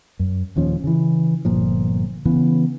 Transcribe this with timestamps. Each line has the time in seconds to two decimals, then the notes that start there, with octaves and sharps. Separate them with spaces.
0.19 F#2
0.56 D#1 D#2 F3 C#4
0.84 C#3 E3
1.45 G1 A#2 F3
2.25 C#3 E3 B3